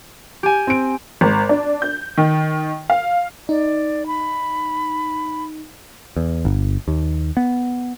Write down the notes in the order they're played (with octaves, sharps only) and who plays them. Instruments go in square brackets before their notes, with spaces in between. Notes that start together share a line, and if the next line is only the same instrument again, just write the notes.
[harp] G4 G#5
[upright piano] C4 D7
[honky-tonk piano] G#1
D4
G6
D#3
F5
[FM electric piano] D#4 [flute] D5
[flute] B5
[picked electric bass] E2
G1
D#2
B3